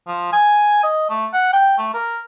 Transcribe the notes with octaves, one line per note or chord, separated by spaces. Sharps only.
F3
G#5
D#5
A3
F#5
G5
A3
A#4